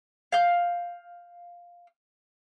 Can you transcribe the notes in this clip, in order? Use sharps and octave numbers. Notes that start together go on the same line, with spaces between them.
F5 G6